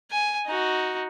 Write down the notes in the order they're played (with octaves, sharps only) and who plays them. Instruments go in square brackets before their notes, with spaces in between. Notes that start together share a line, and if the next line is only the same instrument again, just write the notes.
[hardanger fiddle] G#5
D#4 F#4